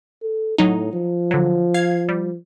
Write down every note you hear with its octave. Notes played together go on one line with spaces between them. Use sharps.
A4
A2 F#3 D#4
F3
D3 F#3
F5 G#6 C7
G3